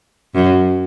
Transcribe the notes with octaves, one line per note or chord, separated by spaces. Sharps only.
F#2